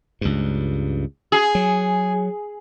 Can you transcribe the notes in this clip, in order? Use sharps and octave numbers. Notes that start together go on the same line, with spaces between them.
C#2 G2
G#4
F#3